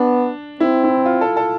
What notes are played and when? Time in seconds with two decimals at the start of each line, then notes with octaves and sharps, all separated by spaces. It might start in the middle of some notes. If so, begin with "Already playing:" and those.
Already playing: B3 D4
0.60 C4 E4
0.84 E4
1.06 F4
1.21 A4
1.37 A4